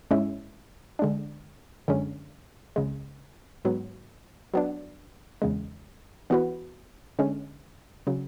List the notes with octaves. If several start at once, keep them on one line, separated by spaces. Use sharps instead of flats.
G#2 G#3 C#4 E4
D3 G#3 D4
F#2 D3 G#3 C#4
C#2 C#3 G#3
G#2 F#3 B3
F#3 B3 D4
E2 C#3 G#3
E3 B3 F#4 B4
D3 G#3 C#4
C#3 F#3